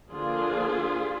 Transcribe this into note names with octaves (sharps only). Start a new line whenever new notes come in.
D3 F3 A#3 D4 F4 G#4